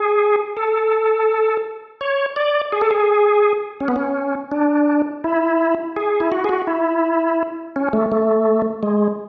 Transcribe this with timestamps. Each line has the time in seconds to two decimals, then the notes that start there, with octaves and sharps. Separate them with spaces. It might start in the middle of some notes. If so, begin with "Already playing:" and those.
Already playing: G#4
0.57 A4
2.01 C#5
2.36 D5
2.72 G#4
2.81 A4
2.91 G#4
3.80 C#4
3.88 B3
3.96 C#4
4.51 D4
5.24 E4
5.96 G#4
6.20 E4
6.32 F#4
6.44 G#4
6.49 F#4
6.67 E4
7.76 C#4
7.93 A3
8.12 A3
8.83 G#3